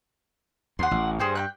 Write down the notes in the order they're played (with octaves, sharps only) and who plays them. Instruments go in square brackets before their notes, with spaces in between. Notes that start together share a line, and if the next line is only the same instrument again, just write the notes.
[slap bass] D#2 [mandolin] F#5 C6
[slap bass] A1
[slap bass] G2 [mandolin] G#4 C5 G5
[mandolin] G5 B5 F#6